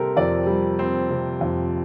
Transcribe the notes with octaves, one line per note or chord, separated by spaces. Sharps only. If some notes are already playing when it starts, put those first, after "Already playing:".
Already playing: C3 G3 C4 G4 A4 A#4
F2 D5
G3
C4
C3
F2